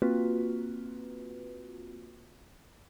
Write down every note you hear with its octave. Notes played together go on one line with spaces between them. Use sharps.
A#3 C4 F4 F#4 B4